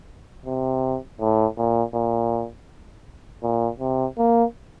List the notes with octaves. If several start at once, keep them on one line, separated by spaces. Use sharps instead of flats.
C3
A2
A#2
A#2
A#2
C3
A#3